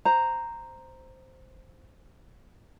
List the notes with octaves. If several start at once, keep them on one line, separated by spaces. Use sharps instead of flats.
C5 A#5